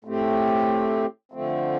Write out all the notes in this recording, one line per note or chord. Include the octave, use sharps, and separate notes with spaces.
A2 A3 C4 G4
D3 F3 A3 C4